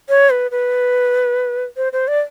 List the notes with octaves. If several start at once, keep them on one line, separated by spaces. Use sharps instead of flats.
C#5
B4
B4
C5
C5
D5